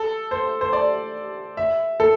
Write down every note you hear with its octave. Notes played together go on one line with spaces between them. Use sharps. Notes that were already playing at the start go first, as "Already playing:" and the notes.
Already playing: A4
C5
C5
D5
E5
A4